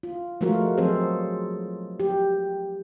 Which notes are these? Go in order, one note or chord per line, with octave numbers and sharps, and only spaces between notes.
F4
F3 G#3 A3 F4 F#4 A#4
F3 F#3 C4 G#4 A4 C5
G4